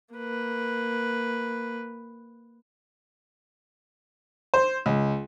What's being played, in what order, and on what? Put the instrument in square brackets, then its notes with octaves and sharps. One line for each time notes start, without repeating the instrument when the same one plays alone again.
[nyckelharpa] A#3 B4
[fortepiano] C5
C#2